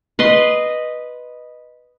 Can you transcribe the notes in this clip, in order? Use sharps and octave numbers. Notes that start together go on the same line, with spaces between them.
B4 D#5 C6